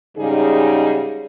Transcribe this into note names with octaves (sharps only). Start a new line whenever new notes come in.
G#2 C#3 G3 D#4 G#4